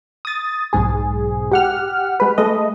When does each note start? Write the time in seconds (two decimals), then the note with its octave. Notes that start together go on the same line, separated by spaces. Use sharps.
0.25 D#6 A6
0.73 B1 G#2 G#4
1.52 G4 F#5 F6
2.20 G#3 B4
2.38 G#3 A3 D#5